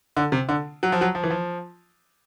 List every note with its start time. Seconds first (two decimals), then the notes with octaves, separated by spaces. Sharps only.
0.17 D3
0.32 C3
0.49 D3
0.83 F#3
0.92 F3
1.01 F#3
1.15 F3
1.24 E3
1.30 F3